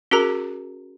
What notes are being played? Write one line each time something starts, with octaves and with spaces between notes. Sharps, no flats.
C#4 F#4 G#4 A#4 A#5